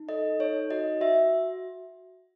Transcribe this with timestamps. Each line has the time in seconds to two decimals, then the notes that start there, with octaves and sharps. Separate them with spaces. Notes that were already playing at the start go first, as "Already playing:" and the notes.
Already playing: D#4
0.09 A4 D#5
0.39 D#4 C#5
0.71 F#4 D#5
1.01 F#4 E5